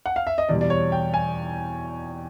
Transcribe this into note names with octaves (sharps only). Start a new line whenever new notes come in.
F#5
F5
E5
D#5
E2 B2 G3 D5
D5
C#5
G5
G#5